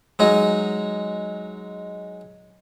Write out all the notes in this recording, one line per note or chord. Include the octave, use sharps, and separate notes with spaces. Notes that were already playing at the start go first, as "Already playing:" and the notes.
F#3 G#3 D#4